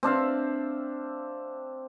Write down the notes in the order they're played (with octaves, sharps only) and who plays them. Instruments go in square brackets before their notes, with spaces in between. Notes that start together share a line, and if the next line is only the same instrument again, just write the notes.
[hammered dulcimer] C4 D4 E5 F5